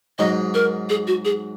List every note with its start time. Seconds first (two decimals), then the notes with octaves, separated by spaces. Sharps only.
0.19 G#2 F#3 D#4 D#5
0.54 A#4
0.90 G#4
1.07 F#4
1.25 G#4